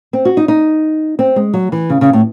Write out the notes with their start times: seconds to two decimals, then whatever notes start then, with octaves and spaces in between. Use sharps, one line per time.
0.13 C4
0.25 F#4
0.37 D#4
0.48 D#4
1.19 C4
1.36 G#3
1.54 F#3
1.72 E3
1.90 C#3
2.01 C#3
2.13 A2